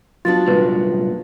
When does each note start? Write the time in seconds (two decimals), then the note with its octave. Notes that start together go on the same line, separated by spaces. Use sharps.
0.25 F#3 B3 D4 F4 A6
0.48 C2 F#2 A#2 B4